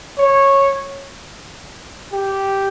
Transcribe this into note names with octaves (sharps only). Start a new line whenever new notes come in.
C#5
G4